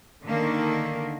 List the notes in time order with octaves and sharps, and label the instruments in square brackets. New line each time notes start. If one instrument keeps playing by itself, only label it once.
[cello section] D3 D#3 A#3